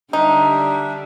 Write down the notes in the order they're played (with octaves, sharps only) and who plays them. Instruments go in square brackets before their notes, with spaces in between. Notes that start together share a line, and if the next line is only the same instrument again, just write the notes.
[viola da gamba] D3 G3 [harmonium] D4 G4 E5 [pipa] D#4